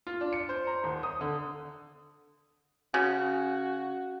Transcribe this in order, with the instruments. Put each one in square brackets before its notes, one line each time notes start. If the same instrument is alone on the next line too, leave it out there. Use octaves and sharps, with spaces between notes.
[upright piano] F4
D4
C#7
C5
A#5
D#1
D#6
D3
[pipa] C#3 [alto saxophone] F#4